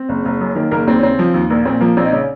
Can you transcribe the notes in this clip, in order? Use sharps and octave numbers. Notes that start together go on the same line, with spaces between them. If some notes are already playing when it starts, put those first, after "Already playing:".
Already playing: C4
F#1
F#1
F#2
D#3 A#3 A#4
F#1 A#3 A#4
D#2 C4
C#4
C#3 C4
F3
D#2
A#1 A#3
A#2 C4
F3 A#3
A#1 C4
D#4
C#3 C#4